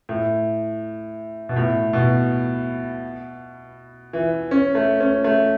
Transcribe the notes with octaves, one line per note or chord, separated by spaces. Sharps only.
A2
B2
A2
B2
E3
C#4
A3
C#4
A3